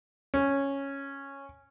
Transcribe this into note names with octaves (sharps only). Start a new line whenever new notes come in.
C#4